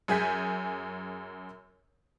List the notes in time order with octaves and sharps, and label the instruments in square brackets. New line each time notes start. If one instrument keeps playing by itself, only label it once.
[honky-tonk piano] F#2 G#4 G#5 G6 B6